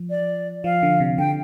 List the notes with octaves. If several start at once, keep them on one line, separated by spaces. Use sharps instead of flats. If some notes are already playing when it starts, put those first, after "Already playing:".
Already playing: F3
D5
F3 F5
D3
C3
D3 G5